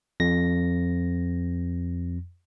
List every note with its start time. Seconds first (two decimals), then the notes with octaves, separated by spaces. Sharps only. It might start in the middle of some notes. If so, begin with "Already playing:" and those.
0.20 F2 A#6